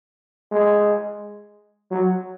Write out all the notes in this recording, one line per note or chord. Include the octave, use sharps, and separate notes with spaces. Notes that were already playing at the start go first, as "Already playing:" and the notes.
G#3
F#3